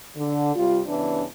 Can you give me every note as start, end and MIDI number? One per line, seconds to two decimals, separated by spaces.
0.17 0.55 50
0.55 0.80 48
0.55 0.80 55
0.55 0.80 65
0.87 1.24 43
0.87 1.24 49
0.87 1.24 52
0.87 1.24 59
0.87 1.24 62